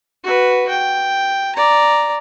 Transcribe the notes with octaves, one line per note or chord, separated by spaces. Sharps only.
F#4 B4
G5
D5 A#5